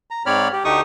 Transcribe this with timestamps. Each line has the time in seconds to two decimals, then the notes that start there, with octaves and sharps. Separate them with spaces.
0.11 A#5
0.26 G#2 C4 C#5 D5 B5 F6
0.53 G4
0.65 D2 A3 D#4 G4 C#6 D#6